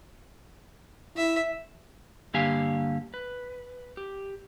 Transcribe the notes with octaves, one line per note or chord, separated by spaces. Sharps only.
E4 E5
G2 D3 A#3 G4 F5 G#5
B4
G4